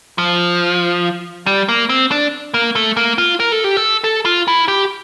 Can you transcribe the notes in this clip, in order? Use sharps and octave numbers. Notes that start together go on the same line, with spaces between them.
F3
G3
A#3
C4
D4
A#3
A3
A#3
F4
A#4
A4
G4
A4
A4
F4
E4
G4